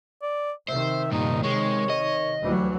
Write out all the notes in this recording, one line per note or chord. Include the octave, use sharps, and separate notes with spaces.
D5
C3 D#3 C5 E5
G2 A#2 D#4
G#3 C#5
D#5
D2 E3 F#3 G3